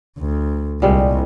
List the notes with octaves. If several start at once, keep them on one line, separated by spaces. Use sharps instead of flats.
D2
C2 A#2 G3 G#3